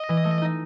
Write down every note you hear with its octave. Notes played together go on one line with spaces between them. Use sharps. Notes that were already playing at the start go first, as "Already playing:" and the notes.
Already playing: D#5
E3
A3
D#4